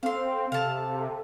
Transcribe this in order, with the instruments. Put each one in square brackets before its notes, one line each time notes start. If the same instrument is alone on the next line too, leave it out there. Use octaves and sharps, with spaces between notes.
[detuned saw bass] C4 [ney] A4 [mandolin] F5 C6
[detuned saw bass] C3 [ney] A4 [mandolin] F5 A5